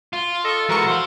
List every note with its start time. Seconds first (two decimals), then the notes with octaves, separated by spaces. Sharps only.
0.13 F4
0.45 A4 D#5 C#6
0.69 E3 G#3 F#4 A#4 C#6
0.87 C5 F5